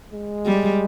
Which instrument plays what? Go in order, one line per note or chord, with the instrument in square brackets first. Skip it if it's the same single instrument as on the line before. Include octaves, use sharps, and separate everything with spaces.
[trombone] G#3
[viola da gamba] G3